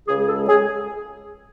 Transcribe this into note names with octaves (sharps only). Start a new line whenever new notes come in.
C#2 C#3 G#3 G#4
G#4
A4
G#4